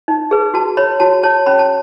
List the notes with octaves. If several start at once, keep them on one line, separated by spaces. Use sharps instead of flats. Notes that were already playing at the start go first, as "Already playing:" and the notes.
D#4
G#4 B4
F#4 A5
C#5 B5
F#4 A5
C#5 A5
C#4 B5
A5